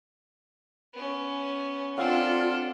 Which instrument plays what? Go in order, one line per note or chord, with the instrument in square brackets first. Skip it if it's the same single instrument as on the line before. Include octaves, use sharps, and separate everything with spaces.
[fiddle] B3 C#4
[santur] C4 F5 F#5 [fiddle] D4 A4 [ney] F4